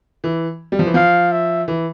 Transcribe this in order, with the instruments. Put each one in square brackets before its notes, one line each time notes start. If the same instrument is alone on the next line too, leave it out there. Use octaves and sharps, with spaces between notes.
[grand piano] E3
G3
F3
E3
[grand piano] F3 [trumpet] F5
[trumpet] E5
[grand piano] E3